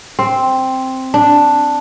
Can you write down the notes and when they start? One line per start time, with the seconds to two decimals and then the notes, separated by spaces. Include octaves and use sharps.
0.19 C4
1.14 D4